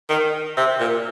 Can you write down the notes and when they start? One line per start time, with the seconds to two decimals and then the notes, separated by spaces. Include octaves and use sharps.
0.09 D#3
0.57 C3
0.80 A#2